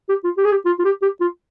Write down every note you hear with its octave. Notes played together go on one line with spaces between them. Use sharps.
G4
F4
G4
G#4
G4
F4
F4
G4
G4
F4